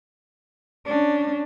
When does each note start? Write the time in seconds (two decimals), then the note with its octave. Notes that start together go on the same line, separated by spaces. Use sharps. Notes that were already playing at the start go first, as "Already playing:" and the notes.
0.85 C#4 D4